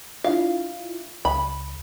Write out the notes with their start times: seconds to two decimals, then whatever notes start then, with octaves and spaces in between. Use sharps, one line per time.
0.24 D4 E4 F4 F5
1.25 C#2 B5